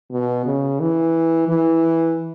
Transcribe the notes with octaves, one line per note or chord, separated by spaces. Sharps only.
B2
C#3
E3
E3